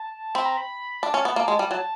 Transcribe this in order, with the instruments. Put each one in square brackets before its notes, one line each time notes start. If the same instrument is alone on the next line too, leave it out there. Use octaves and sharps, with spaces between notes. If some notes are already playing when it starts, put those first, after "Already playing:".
Already playing: [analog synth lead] A5
[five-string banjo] C4 [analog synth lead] B5
[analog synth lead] A#5
B5
[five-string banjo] D4 [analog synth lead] A5
[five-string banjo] C#4
B3
A#3
G#3
G3
[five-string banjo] F#3 [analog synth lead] A5